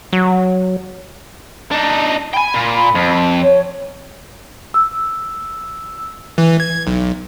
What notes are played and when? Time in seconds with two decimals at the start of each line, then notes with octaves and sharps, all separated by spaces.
0.13 F#3
1.71 D4 D#4
2.34 G5 G#5 B5
2.54 A#2
2.95 F2
3.41 C#5
4.74 E6
6.38 E3
6.60 G#6
6.87 B1